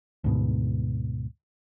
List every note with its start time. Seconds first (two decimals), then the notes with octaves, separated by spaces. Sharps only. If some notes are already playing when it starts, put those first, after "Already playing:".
0.24 D2 G#2 B2